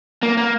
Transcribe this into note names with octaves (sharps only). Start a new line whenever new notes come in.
A#3
A#3